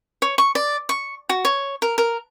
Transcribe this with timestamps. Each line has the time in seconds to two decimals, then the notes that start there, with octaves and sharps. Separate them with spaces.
0.22 C#5
0.38 C#6
0.55 D5
0.89 C#6
1.29 F#4
1.45 C#5
1.82 A#4
1.98 A#4